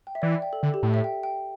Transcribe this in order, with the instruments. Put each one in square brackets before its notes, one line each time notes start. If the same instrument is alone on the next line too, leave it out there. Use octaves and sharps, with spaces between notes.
[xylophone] G5
E5
[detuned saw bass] E3 [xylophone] D5
[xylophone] E5
G5
A4
[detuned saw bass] D3 [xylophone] A4
[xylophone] G4
[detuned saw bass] A2 [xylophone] A4
[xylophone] E5
G5
G5